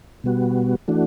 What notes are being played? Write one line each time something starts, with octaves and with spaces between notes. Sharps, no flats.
B2 G3 B3 F#4
E3 A3 D4 F#4